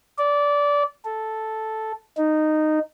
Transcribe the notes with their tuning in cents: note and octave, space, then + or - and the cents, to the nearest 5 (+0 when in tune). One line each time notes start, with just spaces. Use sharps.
D5 -20
A4 -5
D#4 -10